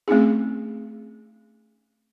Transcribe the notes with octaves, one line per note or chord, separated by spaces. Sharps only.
A3 C4 C#4 D#4 G#4